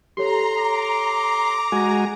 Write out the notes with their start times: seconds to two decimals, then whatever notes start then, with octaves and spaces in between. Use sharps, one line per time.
0.17 G4 A4 C#5 A#5 C6
0.59 D6
1.72 G#3 F#4 G#5